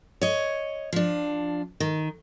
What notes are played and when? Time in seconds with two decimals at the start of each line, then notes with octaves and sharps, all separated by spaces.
0.21 C#5 D#5
0.93 F3 D4
1.80 D#3